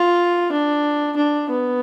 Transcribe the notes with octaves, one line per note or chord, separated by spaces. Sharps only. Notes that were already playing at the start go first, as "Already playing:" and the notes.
Already playing: F4
D4
D4
B3